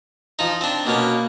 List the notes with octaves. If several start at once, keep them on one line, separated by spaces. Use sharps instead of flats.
F3 D#4
C4 D4
B2 A#3 C#4